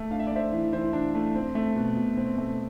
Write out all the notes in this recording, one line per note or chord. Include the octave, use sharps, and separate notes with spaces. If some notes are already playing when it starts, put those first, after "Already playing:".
Already playing: A3
D4 F5
E5
D5
A3 C5 E5
E3
E3 C5 E5
D4
A3
C4
A3
B2
B2
C4
A3